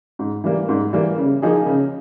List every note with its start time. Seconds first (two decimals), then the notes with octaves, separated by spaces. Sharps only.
0.19 G#2
0.44 E3 G3 A#3
0.69 G#2
0.93 E3 G3 A#3
1.18 C#3
1.42 F3 A#3 D#4 G#4
1.66 C#3